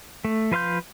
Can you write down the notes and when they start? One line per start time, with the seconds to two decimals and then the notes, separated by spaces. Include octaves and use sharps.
0.25 A3
0.51 F3 B4 F5 C6 G6